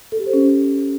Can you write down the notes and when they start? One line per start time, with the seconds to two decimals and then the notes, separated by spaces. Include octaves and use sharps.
0.12 A4
0.19 G4
0.26 C5
0.33 C#4